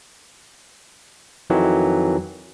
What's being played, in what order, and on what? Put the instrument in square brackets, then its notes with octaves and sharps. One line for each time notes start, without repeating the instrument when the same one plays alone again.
[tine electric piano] F2 D#3 E3 F#3